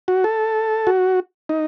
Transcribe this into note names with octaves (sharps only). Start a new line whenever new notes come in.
F#4
A4
F#4
D#4